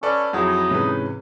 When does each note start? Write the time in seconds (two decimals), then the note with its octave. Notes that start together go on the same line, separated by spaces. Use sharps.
0.03 C#4 A4 B4 D5
0.33 F2 F#3 D#4 E4 G#4 F#5
0.71 G#2 C3 E3 C#4 B4